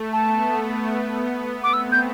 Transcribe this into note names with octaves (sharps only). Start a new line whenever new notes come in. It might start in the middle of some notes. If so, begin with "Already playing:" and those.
Already playing: A3
B3 A5
D6
A3 C4 E6
G6